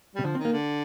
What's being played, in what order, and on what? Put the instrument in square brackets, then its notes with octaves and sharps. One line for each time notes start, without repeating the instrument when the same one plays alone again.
[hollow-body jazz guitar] C3 [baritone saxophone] G3
[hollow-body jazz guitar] D3 [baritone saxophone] F3
[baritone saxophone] D#3 [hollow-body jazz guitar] C4
[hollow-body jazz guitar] A#3
[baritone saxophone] D3